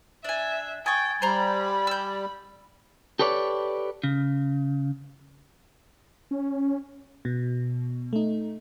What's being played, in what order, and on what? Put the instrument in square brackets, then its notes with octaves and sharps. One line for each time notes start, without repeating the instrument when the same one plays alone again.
[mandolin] D4 G#5 [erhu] E5
[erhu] G5 [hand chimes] G#5 G#6 A6 [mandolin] C#6 D#6
[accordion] G3 [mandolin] C5 A#5 [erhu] B5
[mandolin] E6 G6
[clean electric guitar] G4 A4 B4 C#5 D5
C#3
[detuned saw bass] C#4
[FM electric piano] B2
A3 D#4